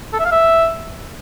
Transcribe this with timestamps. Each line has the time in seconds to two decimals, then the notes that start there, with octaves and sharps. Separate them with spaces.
0.13 A4
0.19 E5
0.25 F5
0.31 E5